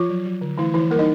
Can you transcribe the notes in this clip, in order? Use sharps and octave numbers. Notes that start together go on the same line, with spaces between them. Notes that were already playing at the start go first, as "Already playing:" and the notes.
Already playing: F3 F4
F#3
F#3
D3
E3 A3 E4
E3 F3 E4
G3 A#3 A#4
D#4 D#5